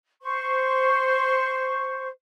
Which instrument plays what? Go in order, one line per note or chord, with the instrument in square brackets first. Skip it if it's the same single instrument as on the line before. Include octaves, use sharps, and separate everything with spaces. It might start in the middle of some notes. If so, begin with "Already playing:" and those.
[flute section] C5 C#6